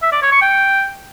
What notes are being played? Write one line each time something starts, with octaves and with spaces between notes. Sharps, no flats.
E5
D5
C#5
C#6
G5